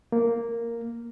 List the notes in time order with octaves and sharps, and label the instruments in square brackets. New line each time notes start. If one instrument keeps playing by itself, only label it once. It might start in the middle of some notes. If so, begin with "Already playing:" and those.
[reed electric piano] A#3